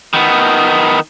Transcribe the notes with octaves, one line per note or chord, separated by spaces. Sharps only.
D#3 B3